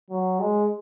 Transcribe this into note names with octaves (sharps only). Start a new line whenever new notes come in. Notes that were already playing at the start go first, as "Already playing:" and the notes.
F#3
G#3